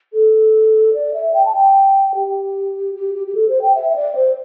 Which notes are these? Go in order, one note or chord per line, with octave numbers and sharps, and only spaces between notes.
A4
D5
E5
G5
A5
G5
G4
G4
G4
G4
A4
C5
G5
E5
E5
D5
C5